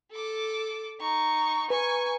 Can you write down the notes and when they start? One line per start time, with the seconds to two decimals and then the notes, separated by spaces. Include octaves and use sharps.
0.11 A4 D6
1.00 D#4 C#6
1.70 B4 G#5 A#5 C#6